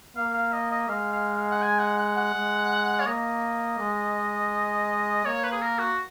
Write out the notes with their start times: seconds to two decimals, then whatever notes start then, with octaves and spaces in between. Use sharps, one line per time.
0.17 A#3 F5
0.34 F5
0.53 D#5
0.71 D#5
0.89 G#3 F5
1.13 F5
1.37 F5
1.51 F#5
1.62 G#5
1.80 F#5
1.99 F#5
2.17 F#5
2.34 G#3
3.00 C#5
3.06 A#3 D#5
3.79 G#3
5.25 A#3 C#5
5.44 B4
5.52 G#4
5.62 A#4
5.79 F#4